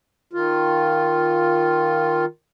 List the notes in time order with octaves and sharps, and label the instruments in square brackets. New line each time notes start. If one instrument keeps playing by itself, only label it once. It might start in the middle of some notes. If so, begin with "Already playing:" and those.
[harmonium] D#3 F4